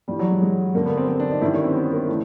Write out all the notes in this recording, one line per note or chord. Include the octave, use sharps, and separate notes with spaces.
G2 E3 G3
F#3
G#3
G#3
G2 D3 A#3
B3
C4
C4
D4
D#4
G2 D#3 E4
C#4
C4
B3
A#3
E3 A3